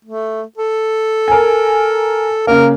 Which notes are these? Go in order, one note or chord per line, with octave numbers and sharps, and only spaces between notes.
A3
A4
A#4 G#5
C#3 A#3 A#4